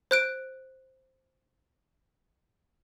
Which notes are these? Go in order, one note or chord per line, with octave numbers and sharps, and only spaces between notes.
C5 F#6 D7